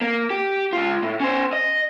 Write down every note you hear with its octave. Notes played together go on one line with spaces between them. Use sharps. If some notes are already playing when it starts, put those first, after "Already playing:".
A#3
G4
C#2 F4
A2
C#4 C5
D#5